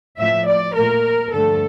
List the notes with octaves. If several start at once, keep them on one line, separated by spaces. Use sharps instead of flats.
A2 F3 A3 E5
D5
A#2 A3 A#4
G2 D3 F3 A3 A4